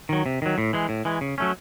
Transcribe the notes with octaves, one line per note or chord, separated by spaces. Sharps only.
D#3 F#3
C3
D#3 F#3
A2
E3 G#3
A2
E3 G#3
C#3
F#3 A3 C#4